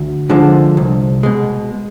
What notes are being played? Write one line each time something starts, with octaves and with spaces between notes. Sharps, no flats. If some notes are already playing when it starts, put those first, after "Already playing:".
Already playing: D2
D3 F3 G#3
C2
B2 G#3